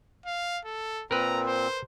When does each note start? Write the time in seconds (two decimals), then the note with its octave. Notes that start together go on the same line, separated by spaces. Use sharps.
0.26 F5
0.65 A4
1.11 A#2 C4 A#4 B4 A#5
1.46 C5